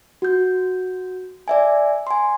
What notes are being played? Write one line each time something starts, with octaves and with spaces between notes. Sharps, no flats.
F#4 G6
D5 E5 G#5
G#5 C6